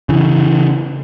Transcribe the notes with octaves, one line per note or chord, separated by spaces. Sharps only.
C#3 E3